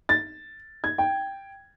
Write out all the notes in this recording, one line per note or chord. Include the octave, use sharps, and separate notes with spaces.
A6
G#6
G5